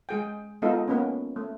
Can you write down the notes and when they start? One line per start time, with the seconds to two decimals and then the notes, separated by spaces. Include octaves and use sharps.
0.09 G#3 G#4 G5
0.62 G#3 B3 D#4 F4 A4 D#5
0.88 A#3 B3 C#4
1.36 A3